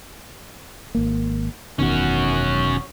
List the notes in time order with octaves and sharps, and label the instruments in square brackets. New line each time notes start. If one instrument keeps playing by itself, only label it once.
[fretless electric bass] G#1 A#3
[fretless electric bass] E1 B2 D#3 [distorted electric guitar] C#4 F#4